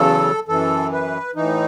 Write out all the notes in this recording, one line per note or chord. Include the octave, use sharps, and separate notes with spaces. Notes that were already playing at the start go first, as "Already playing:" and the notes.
Already playing: E2 C#3 F#3 A4
F#2 E3 A4
B4
A2 E3 D#4